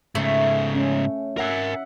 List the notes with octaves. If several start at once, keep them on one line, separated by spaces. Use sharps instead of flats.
G#2 C#3 A3
C#4
A#4 E5 F#5 G#5